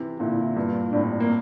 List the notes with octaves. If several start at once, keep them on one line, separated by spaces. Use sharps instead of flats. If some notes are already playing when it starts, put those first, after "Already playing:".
Already playing: C3 E3
A#2 D3 E4
G2 A#2
A2 C3 D4
A#3